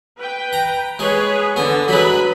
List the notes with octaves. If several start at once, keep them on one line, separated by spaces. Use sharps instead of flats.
B4 G5
A#5
G#3 G#4 B4 C#5
D3 B3
F#3 G#3 B4 B5